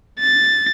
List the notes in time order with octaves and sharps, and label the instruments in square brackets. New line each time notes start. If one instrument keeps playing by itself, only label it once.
[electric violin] A6